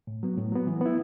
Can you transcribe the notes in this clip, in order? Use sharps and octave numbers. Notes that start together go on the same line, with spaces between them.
A2
F#3 B3
A2
F#3 B3
E3
B3 E4